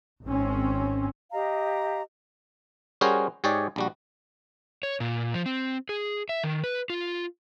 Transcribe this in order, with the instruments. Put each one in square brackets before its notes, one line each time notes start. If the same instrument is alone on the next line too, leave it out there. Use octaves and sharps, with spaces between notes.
[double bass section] G#1 C4 C#4
[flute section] G4 D#5 F5 A#5
[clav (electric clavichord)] G3 C#4 F#4 G#4 A#4 C5
G#2 G4 G#4 C#5 D5
A#1 G3 F#4
[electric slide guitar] C#5
A#2
F3
C4
G#4
E5
D#3
B4
F4